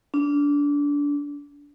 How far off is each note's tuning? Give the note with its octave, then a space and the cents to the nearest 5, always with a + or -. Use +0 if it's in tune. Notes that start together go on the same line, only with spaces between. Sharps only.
D4 -25